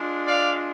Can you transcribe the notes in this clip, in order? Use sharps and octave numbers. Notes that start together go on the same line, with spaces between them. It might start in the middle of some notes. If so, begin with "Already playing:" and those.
Already playing: G#3 D4 F4
D5 F5